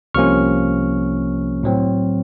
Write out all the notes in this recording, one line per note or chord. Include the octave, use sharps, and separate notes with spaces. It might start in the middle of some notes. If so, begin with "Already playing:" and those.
C2 C3 F3 A#3 C#4 C#6 F6
A2 F#3 C4